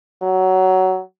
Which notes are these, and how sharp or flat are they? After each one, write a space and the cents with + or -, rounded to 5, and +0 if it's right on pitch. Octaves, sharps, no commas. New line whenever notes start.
F#3 +15